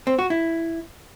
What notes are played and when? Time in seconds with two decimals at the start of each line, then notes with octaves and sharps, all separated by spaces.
0.07 C4
0.19 F#4
0.30 E4